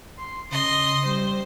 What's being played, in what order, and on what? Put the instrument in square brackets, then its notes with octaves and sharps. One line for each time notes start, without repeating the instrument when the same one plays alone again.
[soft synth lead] C6
[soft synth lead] C#3 [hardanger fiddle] D#5 C6
[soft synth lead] G3 [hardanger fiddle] C5